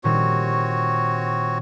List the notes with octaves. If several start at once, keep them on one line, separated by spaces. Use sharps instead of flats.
A#2 D#3 G3 C4 F#4 C#5